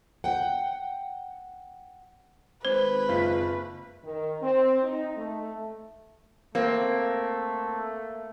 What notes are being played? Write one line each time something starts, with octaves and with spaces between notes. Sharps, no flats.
F#5 G5
G#1 B4 C5
F#1 F4 B6
D#3
C4
D#4
A3
A3 A#3 C4